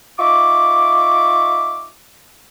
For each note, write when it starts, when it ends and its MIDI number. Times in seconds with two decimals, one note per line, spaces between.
0.19 1.90 63
0.19 1.90 65
0.19 1.90 76
0.19 1.90 85
0.19 1.90 86